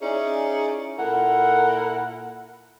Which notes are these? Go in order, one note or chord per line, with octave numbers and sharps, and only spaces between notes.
C#4 D#4 E4 G#4 C#5 D5
A#2 E4 A4 A#4 F#5